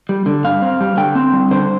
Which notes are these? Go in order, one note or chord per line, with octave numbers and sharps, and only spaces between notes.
G3
D3
G2 F5
C4
G3
D3 G5
C4
G3
D3 C5